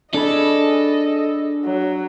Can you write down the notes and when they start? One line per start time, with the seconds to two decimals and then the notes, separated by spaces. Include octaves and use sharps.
0.14 D4 G#4 A4 D#5 B5
1.65 F#3